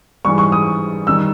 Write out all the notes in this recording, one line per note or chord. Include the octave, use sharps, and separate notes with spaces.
G#2 E3 G3 C#6
C#6
D#6
D#3 G3 E6